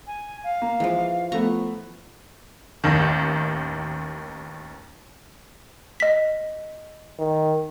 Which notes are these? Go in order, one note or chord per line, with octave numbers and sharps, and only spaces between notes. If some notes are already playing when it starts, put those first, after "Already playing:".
G#5
F5
A#3
E3 F3 G#3
F3 A3 B3 A#5 C#6
A1 D#2 D#3
D#5 B6
D#3